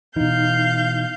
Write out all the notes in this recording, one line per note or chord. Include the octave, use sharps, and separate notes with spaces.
B2 E3 D#4 F5 G6